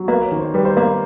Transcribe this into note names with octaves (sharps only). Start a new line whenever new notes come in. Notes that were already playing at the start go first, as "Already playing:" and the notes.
Already playing: F#3
A#3 B4
C#5
D#3
C5
G3 B4
C5
A#3 B4